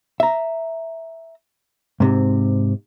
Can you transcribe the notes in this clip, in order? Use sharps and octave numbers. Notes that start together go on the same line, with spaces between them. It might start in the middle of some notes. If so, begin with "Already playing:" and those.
E5 A#5
G#2 C3